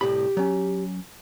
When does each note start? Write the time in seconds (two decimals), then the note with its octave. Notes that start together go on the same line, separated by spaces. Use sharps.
0.01 C2 A2 G4 B5
0.37 F#3 C#4